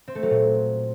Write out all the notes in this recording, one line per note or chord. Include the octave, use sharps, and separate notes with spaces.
C4
A3
F#3
A#2